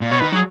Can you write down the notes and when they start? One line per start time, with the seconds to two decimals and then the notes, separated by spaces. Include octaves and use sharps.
0.01 A#2
0.11 B2 C#5
0.20 D#3 B4
0.32 F#3 G#4